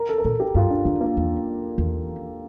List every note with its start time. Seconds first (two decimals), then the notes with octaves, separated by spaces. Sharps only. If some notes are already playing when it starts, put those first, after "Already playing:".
Already playing: A#4
0.09 A4
0.18 A#4
0.25 A#2 A4
0.40 G4
0.55 G2 F4
0.70 D4
0.85 F2 D4
1.01 A#3
1.17 E2
1.78 E2